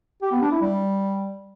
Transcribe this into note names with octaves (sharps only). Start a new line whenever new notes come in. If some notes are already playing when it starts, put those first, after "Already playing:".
G4
B3
D4
E4
G3